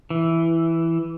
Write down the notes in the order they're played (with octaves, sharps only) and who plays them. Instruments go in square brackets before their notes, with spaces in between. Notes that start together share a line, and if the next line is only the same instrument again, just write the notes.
[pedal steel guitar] E3